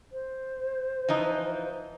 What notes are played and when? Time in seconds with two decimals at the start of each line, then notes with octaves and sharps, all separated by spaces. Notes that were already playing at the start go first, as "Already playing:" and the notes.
0.12 C5
1.09 E3 F3 D#4